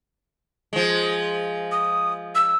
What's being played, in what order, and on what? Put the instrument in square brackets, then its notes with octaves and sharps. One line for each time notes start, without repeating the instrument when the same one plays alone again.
[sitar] F3 G#3
[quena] D#6
E6